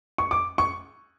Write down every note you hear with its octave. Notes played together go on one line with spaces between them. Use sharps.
C#6
D6
C#6